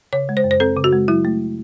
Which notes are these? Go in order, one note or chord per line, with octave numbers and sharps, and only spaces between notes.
C#3 C#5
G#3
C5
F#2
C5
C4 A4
C#3
F#4
G#3
F#3 E4
A3